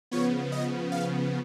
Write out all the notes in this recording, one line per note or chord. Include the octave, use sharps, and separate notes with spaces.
C#3 F3 B3 C#5
D#5
F5